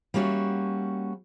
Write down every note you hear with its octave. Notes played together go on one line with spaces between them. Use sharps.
G3 A#3 C#4 F#4 E5